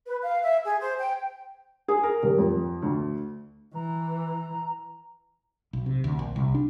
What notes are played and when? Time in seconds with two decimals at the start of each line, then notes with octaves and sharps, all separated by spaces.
0.06 B4
0.22 F5
0.43 E5
0.64 G#4
0.80 C5
0.98 G5
1.88 G#4
2.03 A#4
2.23 D#1
2.38 F2
2.82 D2
3.75 E3 A#5
5.73 B1
5.86 C3
6.04 D2
6.19 A#1
6.36 C2
6.54 D4